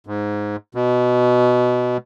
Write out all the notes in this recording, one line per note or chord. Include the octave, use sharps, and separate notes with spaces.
G#2
B2